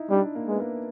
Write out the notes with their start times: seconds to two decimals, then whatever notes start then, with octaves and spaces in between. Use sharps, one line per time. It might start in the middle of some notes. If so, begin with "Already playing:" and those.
Already playing: D#4 E4
0.10 G3 D4
0.35 A#3
0.47 G#3 B3
0.60 A#3